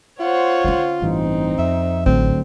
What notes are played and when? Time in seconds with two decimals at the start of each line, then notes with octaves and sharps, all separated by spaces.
0.20 F4 C5 C#5 F#5
0.64 D3 C#4
1.02 A1 G2 E3 C4 D#4
1.59 F2 E5
2.06 A1 D3 F#3 A3 C4